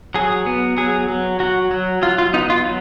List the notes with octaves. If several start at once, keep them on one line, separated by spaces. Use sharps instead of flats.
F#3 G#4
B3
F#3 G#4
F#3
F#3 F#4
F#3
F#3 F4
F4
B3 D#4
F4
F#3